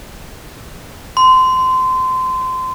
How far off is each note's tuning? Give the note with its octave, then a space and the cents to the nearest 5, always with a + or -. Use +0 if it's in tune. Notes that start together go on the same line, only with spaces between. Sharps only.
C6 -25